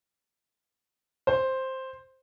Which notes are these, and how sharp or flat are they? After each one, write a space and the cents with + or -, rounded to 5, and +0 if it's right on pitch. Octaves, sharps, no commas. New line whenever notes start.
C5 +5